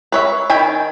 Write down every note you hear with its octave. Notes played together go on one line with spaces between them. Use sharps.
B4 C#5 E5
D#3 G5 G#5 B5